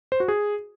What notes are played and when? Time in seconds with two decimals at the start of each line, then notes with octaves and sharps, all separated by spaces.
0.12 C5
0.20 F#4
0.28 G#4